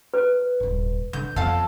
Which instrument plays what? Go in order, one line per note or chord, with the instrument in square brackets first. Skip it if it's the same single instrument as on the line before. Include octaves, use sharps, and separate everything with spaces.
[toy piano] B4
[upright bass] D#1 G#2
[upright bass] D3 [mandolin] G6
[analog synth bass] F2 [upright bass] B3 [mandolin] A4 F5